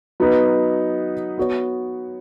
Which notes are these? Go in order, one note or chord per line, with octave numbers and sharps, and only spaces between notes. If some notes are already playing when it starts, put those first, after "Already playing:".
F#3 B3 D#4 B4
B3 F#4 C#5